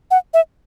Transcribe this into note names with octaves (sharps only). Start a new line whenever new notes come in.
F#5
E5